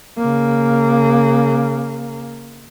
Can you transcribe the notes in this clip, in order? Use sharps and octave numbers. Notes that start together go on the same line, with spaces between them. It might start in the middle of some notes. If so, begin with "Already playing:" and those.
C#3 A#3